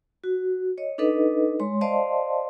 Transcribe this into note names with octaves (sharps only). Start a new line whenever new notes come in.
F#4
C#5 D#5
D4 D#4 A4 B4 D#5
G#3 C#5 C6
C5 D5 D#5 F5 A5 C6